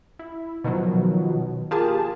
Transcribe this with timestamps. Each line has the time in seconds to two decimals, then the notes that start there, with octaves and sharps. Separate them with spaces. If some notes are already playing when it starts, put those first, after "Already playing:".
0.19 E4
0.64 B2 D#3 F3 F#3
1.71 A#3 F4 G4 G#4 A5